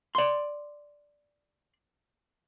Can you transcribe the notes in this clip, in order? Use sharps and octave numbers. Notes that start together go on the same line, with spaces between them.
D5 C6